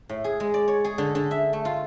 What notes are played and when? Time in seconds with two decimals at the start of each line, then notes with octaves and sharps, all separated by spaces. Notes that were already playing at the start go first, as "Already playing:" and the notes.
0.09 A2
0.24 G#4
0.40 G#3
0.54 D5
0.68 C#5
0.84 G#4
0.98 D3
1.15 D3
1.31 E5
1.53 A3
1.65 F4